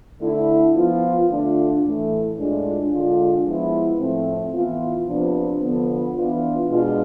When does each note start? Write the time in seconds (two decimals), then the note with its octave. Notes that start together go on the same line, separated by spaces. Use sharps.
0.21 D3 A3 E4
0.75 F3 B3 F4
1.29 D3 A3 D4 F4
1.83 A2 E3 A3
2.37 A2 G#3 D4 F4
2.91 D3 G#3 D4 F4
3.45 F3 G#3 B3 E4
3.99 A2 F3 A3 C4
4.53 E3 B3 F4
5.08 C3 F3 B3 D4
5.62 D3 F3 B3
6.15 E3 B3 D4 F4
6.70 B2 G#3 D4 F4